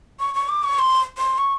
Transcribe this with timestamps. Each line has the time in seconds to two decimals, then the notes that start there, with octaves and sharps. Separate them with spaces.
0.20 C#6
0.35 C#6
0.49 D6
0.64 C#6
0.79 C6
1.18 C6
1.38 C#6